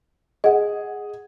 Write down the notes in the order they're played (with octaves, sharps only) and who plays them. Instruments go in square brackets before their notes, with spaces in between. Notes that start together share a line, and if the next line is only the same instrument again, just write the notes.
[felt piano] G#4 [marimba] D#5 F#5